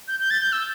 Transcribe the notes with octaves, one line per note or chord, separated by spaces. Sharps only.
G6
G6
A6
G6
E6